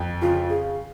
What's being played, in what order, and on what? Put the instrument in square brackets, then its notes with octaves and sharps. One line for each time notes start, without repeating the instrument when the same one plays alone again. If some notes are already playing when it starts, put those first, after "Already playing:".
Already playing: [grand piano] F2
[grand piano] C#3 [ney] F4
[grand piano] F4 [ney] G#4